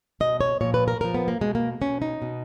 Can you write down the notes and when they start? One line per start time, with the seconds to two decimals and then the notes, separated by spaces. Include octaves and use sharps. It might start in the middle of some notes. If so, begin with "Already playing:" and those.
0.20 B2 D#5
0.41 C#5
0.61 A#2 F3 C#5
0.74 B4
0.88 A#4
1.01 A#2 F3 A#4
1.14 B3
1.28 A#3
1.41 B2 G#3
1.55 A#3
1.81 B2 C#4
2.02 D#4
2.22 B2